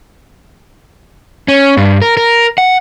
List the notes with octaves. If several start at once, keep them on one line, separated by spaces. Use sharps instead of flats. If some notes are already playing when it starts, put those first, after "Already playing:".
C#4
G2
A#4
A#4
F#5